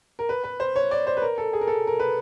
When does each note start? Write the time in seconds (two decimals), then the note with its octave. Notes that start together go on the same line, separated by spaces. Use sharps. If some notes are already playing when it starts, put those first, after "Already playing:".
0.19 A#4
0.29 B4
0.44 B4
0.60 C5
0.76 C#5
0.91 D5
1.07 C5
1.17 B4
1.22 A#4
1.38 A4
1.53 G#4
1.61 A#4
1.68 A4
1.87 A#4
2.00 B4